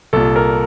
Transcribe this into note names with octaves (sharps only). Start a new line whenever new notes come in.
C2 A#2 A4
A#4